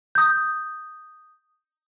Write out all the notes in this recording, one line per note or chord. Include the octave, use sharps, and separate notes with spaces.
D#6 G6